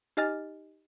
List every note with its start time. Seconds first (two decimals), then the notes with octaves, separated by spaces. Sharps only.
0.17 D#4 G4 D#5 G#5 F6 A6